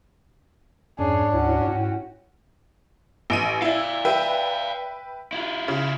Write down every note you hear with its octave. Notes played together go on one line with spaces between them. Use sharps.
F2 G#2 C#4 D4 G#4 C#5
D2 C#4 E4 F#4 C#5
G#2 E4 G5
A1 D7 D#7
E4 D5 E5 F5
B4 E5 G5
E4 F4
C#3